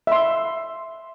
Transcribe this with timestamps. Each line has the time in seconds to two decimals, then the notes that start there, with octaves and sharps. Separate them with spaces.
0.07 E5 C6